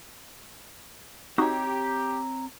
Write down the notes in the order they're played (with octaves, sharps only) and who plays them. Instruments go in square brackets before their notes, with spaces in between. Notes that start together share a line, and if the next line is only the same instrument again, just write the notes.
[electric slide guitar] C4 C#5 [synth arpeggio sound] D#4 F#4 [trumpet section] G4 [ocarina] A#5